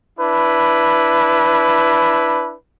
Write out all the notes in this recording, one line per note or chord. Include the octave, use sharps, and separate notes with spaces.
D4 E4 B4